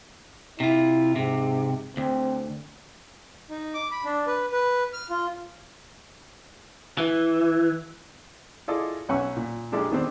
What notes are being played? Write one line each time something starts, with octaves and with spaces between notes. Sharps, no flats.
C3 E4 F4
G#2 C3
D2 C4
D#4
D6
B5
D4
B4
B4
F6
F4
E3
E4 F4 G#4 A4 D5 D#5
B1 C#4 F#5 G#5 C#6 E6
A#2
A#1 G#3 D4 G4 A4
D#3 B3 C4 D4